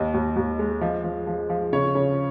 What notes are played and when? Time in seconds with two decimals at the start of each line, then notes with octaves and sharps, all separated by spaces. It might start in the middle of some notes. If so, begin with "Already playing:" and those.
Already playing: D#2 D#5
0.14 D#2
0.36 D#2
0.59 G#3
0.81 F3 D#5
1.04 F3
1.27 F3
1.50 F3
1.73 C#3 C#5
1.95 C#3